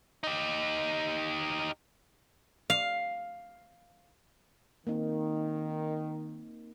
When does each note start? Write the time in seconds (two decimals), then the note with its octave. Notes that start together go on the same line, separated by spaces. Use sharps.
0.23 D#4 G4
2.70 F5
4.87 D#3 A#3 C4 D#4